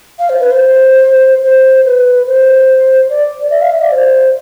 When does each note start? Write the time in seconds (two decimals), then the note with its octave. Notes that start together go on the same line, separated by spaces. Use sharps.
0.19 F5
0.30 C5
0.40 B4
0.51 C5
1.44 C5
1.85 B4
2.27 C5
3.10 D5
3.50 E5
3.62 F5
3.71 E5
3.82 D5
3.92 C5